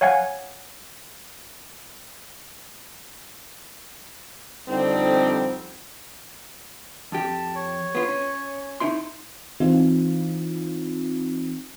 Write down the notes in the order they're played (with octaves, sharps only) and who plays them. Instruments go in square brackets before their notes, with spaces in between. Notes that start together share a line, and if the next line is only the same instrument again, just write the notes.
[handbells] C#5 F5 F#5 G#5 G#6
[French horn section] F2 D3 G3 C4 D#4
[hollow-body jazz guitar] F2 G4 [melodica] A5
[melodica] C#5
[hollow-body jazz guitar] B3 F4
C#4
D#4 E4 C6
[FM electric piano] E3 C4 D#4 F4